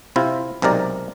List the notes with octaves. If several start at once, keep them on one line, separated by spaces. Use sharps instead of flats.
C3 E4 F4
B1 C3 G#3 A#4 D5